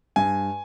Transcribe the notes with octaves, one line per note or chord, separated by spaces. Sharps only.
G2 G#5